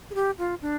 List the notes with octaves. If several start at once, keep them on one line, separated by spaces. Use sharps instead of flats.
G#4
G4
F4
D4